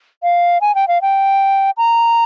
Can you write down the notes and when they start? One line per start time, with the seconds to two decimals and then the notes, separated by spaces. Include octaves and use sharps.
0.23 F5
0.61 G#5
0.75 G5
0.88 F5
1.02 G5
1.77 A#5